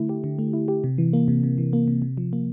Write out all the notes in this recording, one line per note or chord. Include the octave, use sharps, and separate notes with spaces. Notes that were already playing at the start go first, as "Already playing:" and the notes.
Already playing: D3 A3 E4
G4
D3
A3
E4
G4
C3
E3
A#3
C3
C3
E3
A#3
C3
C3
F3
A#3